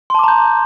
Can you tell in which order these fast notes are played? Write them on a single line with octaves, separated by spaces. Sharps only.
C6 A5 D6 A#5 G6